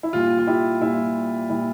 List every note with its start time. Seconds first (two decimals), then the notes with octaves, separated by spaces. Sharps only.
0.03 E4
0.13 A#2 G3 F4
0.38 F4
0.47 E4 G4
0.81 A#2 G3 E4
1.50 A#2 G3 E4